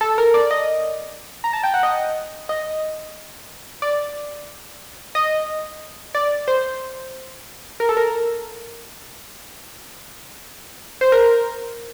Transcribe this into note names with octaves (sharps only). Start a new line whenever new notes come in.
A4
A#4
D5
D#5
A#5
A5
G5
F#5
D#5
D#5
D5
D#5
D5
C5
A#4
A4
A#4
C5
A#4